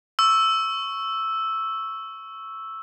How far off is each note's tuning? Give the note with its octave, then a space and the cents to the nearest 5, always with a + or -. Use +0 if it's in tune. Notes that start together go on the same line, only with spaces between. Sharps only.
C#6 +0 E6 +0